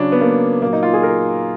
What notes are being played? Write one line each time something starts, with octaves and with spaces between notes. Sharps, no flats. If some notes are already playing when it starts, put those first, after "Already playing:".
Already playing: C#3 F#3 C#4 D4
B3
A#3
A#2 F#3 A#3
D#4
F4
G#4
A#4